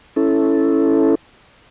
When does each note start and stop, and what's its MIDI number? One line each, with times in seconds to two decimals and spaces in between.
0.16 1.15 61
0.16 1.15 64
0.16 1.15 69